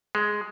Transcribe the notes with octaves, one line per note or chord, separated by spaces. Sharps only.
G#3